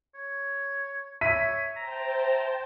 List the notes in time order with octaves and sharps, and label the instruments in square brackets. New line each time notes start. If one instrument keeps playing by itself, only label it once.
[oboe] C#5
[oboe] C#5 [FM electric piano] E5 [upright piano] B6 D#7
[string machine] C5 G5 A5 [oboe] A#5